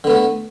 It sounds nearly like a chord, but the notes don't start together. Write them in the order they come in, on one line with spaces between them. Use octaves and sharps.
D3 B3 A3